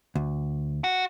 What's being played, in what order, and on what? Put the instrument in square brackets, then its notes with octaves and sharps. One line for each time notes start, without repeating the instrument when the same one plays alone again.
[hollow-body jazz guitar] D2
[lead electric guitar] F#4